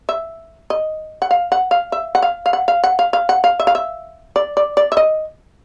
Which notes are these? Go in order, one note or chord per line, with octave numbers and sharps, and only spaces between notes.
E5
D#5
F#5
F5
F#5
F5
E5
F#5
F5
F5
F#5
F5
F#5
F5
F5
F#5
F5
E5
F5
E5
D5
D5
D5
E5
D#5